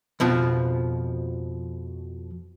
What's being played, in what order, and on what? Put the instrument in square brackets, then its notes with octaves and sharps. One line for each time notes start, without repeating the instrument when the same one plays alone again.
[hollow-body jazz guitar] F2 B2 F3